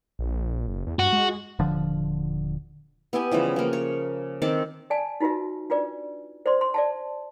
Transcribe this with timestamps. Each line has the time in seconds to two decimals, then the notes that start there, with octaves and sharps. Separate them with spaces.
0.19 A#1
0.68 F#1
0.87 E2
0.99 G2 F#4
1.13 G#3
1.59 D#1 D3 F3
3.13 B3 E4 G4 G#5
3.31 C#3 E3 F3 G3
3.56 F3 A#3
3.73 C#5
4.42 D#3 C4 A4 D6
4.90 D5 G#5 A5
5.21 D#4 F4 F#4 B4 E5
5.70 D4 F4 B4 D5
6.46 C5 D5 C6
6.61 C6
6.74 D5 E5 A5